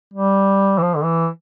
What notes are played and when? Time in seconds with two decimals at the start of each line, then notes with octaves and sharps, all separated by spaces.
0.14 G3
0.78 E3
0.82 F3
0.96 D3
1.04 E3